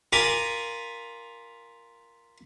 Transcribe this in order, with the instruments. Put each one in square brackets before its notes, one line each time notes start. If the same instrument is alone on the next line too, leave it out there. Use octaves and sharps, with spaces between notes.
[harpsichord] F4 A#4 G#5 B5 D6